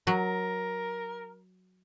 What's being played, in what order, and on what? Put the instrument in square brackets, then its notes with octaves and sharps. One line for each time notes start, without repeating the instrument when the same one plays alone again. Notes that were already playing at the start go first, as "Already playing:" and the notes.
[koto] F#3 [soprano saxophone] A#4